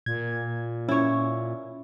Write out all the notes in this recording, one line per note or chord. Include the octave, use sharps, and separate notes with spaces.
A#2 G#6
C#4 E4 C#5